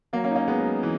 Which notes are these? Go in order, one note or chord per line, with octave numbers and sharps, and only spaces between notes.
F#3 A#3
A#3 C#4
D#4
A#3 C#4
G#3 B3
F#3
E3